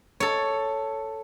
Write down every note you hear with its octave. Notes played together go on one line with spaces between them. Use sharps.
A4 C#5